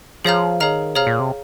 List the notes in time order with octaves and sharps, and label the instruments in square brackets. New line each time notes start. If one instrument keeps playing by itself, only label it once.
[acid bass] F3 [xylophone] G#4 C#5 F5 A#5 F6
[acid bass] D#3 [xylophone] G#4 C#5 F5 A#5 F6
[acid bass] C3 [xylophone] G#4 C#5 F5 A#5 F6
[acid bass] A#2
C3